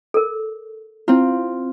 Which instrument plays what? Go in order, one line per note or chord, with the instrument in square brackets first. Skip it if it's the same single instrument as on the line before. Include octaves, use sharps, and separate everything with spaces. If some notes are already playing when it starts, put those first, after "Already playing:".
[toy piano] A4 A#4
[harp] C4 F4 [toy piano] E4